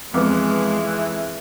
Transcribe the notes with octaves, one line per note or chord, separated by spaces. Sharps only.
F2 E3 G#3 B3 B4 D6